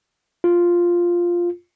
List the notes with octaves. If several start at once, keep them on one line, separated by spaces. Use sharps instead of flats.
F4